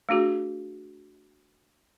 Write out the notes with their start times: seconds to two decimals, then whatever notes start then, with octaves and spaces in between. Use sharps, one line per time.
0.09 A3 D4 F#4 G#4